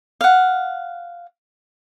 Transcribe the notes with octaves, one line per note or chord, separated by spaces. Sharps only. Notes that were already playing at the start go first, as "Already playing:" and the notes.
F5 F#5